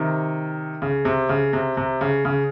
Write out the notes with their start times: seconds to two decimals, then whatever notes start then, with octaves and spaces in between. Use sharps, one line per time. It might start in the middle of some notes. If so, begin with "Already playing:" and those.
Already playing: C3 D#3
0.82 C#3
1.05 C3
1.29 C#3
1.53 C3
1.77 C3
2.01 C#3
2.25 C#3